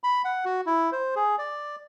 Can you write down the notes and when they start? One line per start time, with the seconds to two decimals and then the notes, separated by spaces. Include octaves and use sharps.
0.04 B5
0.24 F#5
0.45 F#4
0.66 E4
0.92 C5
1.16 G#4
1.38 D5